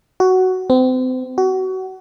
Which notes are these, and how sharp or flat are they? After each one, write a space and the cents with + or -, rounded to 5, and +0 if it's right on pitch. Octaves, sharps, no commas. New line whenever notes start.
F#4 +10
C4 -35
F#4 +25